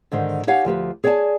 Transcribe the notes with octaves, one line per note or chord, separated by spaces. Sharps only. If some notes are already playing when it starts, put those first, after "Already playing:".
G#2 D3 D#3 C5
D#4 G4 C#5 F5 F#5 G#5
D2 F3 G4 B4
G#4 C#5 D5 F#5 G#5 A5